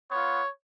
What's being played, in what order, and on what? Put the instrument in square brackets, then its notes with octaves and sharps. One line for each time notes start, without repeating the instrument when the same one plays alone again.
[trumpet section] B3 F4 C#5